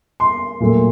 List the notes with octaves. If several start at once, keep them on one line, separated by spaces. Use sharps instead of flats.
C6
A#2 F#3 A3